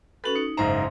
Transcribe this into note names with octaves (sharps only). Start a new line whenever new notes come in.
C#4 F#4 A4 B4 F#7
D#4 C#7
F#1 G#2 C5 D#5 E5 A#5